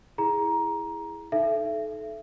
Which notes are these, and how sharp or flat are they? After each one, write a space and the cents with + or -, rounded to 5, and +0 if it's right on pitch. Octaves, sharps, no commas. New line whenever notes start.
E4 +0 G#4 +0 A#5 +15
D#4 +0 A4 -25 E5 +30